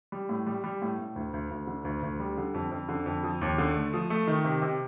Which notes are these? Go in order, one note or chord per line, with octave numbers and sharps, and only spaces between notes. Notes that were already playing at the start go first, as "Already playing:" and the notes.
G3
A2
G3
G3
A2
A2
D2
D2
D2
D3
D2
D2
G3
D3
F2
F2
D3
F2
F3
D#2
D3
A3
F3
A3
D#3
C3
C3